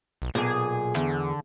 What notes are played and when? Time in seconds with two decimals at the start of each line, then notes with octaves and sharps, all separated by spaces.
0.22 B1
0.35 B1 A#2 G#4
0.96 E2 D3